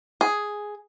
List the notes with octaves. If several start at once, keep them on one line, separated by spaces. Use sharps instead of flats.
G#4